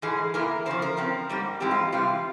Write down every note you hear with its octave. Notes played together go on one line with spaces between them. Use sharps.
G#2 E3 G#3 G#4
E2 E3 A#3 A#4
E2 C#3 F3 C5
A#4
C#3 F3 C4
G#2 G3 A#3
G#2 E3 G#3 C4 G4
F4
C3 E3 G3 F4